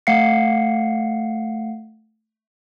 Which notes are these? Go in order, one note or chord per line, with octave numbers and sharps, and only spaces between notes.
A3 F5 F#5 C7 C#7